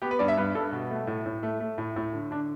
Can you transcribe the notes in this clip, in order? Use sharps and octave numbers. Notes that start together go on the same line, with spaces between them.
B3 G4
B4
G2 D5
E5
G2 B4
G2 A4
B2
A3
A2
A2
A3
A3
A2
A2
D3
D3 D4